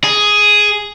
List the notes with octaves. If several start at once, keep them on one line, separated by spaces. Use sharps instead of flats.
G#4